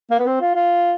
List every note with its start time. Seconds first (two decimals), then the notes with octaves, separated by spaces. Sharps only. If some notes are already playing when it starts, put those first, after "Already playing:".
0.11 A#3
0.19 B3
0.26 C4
0.41 F4
0.55 F4